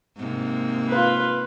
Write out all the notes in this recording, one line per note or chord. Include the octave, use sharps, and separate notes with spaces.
G#2 C3 A#3
F4 B4